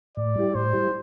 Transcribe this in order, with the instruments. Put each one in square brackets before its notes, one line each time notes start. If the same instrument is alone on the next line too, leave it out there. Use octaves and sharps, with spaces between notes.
[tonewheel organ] A2 [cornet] D5
[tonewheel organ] G3 E4 G4
[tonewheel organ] A2 [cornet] C5
[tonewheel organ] G3 E4 G4